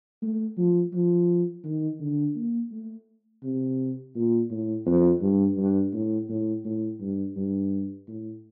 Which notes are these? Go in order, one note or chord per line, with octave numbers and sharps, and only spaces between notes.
A3
F3
F3
D#3
D3
A#3
A3
C3
A#2
A2
F2
G2
G2
A2
A2
A2
G2
G2
A2